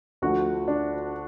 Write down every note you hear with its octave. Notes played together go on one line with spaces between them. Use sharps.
D2 D3 F3 A3 F#4
D4